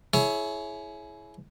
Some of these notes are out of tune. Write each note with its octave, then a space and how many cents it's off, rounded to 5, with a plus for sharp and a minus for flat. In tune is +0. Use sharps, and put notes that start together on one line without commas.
E4 +0 G#4 +30 C#5 +0